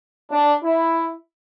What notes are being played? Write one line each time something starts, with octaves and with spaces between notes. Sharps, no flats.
D4
E4